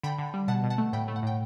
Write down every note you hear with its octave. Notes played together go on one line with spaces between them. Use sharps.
D3 G5 B5
D3
G3
B2 F#5 A5
B2
F#5 A5
A3
A2 G5 B5
A3
F#5
A2 G5